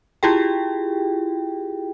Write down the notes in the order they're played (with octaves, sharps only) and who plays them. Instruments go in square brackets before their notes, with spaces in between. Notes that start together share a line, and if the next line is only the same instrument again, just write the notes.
[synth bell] E4 F4 G4 G#4 G5